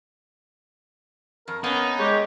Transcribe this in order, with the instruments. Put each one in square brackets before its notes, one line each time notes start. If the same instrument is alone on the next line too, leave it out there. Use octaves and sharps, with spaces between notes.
[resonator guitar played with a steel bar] F2 [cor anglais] A#4
[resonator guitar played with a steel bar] A#3 C#4 [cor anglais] B3 [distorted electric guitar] D#4
[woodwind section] G#3 G4 [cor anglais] C#5